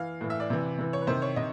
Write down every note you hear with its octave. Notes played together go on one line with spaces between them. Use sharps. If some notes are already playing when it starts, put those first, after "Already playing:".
Already playing: E3 F5
A2 E3
E5
D5
C3 E3
C3 E3
C#5
B4
C3 D#3 C5
C#5
C3 D#5